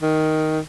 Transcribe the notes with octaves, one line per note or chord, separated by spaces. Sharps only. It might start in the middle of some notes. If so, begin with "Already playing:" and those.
D#3